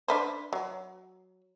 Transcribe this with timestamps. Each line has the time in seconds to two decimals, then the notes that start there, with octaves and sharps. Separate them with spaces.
0.08 D4 B4 C5
0.53 F#3